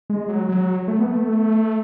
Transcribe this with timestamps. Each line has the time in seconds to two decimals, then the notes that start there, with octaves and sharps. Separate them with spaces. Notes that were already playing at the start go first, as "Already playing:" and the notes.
0.10 G#3
0.28 F#3
0.49 F#3
0.88 A3
0.99 B3
1.11 A3